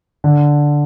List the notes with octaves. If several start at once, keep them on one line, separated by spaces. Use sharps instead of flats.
D3